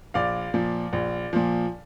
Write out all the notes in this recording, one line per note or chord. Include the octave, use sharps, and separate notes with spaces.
A#1 D5 F5
A#2 F3
A#1
A#2 F3